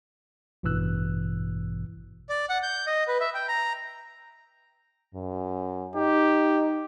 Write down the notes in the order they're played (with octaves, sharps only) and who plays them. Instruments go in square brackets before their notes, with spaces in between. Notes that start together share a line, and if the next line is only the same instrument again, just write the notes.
[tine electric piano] A1 G2 B2 E3 E6 F#6
[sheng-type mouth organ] D5
F#5
G6
D#5
B4
E5
G5
A#5
[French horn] F#2
[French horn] D#4 [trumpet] G4